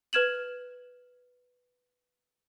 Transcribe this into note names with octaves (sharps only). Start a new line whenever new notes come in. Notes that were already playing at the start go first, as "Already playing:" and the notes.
B4 F6 G#6 E7 F#7